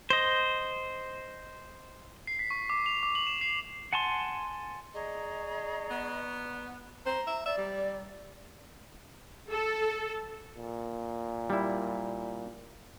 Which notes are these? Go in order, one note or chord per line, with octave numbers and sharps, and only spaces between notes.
C5 D#5
C7
B6
C#6
D6
F7
D6
F#7
E7
C7
F#5 G#5 A5 C6
G#4 D5 D#5 A#5 C#6
B3
C5 A#5
E5
D5 E5
G3
A4
A#2
G3 E4